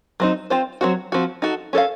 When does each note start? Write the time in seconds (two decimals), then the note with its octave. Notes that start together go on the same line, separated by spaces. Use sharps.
0.20 F#3 C4 D#4
0.50 C4 F4 C5
0.81 F#3 A3 C4 F#4
1.12 F3 C4 F#4
1.42 D#4 F#4 A4
1.73 C#4 A4 C5 F5